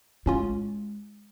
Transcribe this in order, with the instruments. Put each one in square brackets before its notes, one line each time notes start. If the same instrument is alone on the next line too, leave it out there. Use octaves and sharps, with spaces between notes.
[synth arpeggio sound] A2 C#4 F4 [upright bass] G#3